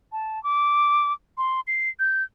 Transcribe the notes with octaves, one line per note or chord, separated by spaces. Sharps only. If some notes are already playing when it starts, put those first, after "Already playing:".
A5
D6
C6
C7
G6